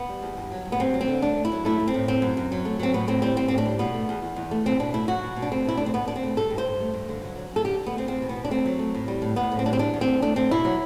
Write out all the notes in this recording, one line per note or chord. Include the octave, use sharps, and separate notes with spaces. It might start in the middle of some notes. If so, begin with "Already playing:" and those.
Already playing: B3
G3
E2
G2
F#3
G2
B3
G2 C4
F#3
C4
D3
A3 D4
A3
E4
F#3
A3 E4
A3
C4
A2
A3 C4
F#2
F#2
F#3
A3
F#3 C4
A2 B3
A2 C4
G3 C4
G3 C4
A2 C4
D4
G3
B2 B3
A3
E2
E2
E2
A3
B2 C4
B2 D4
A3 E4
F#3 F#4
B2
B2
D4
A3 C4
B2 E4
A3 D4
C4
B2 B3
B2 D4
C4
A3
G2 A4
G2
C5
G2
A3
G2
D3
F#3
F#3
F#2 A4
D3 G4
D3
B3
A3 C4
E2 C4
B2
B3
B2
D4
A3 C4
F#3
A3
A2
G3
A2
A2 B3
A2
C4
G3 D4
C4
E2 D4
E2
C4
A3
A3 D4
A3 C4
B2 E4
F#3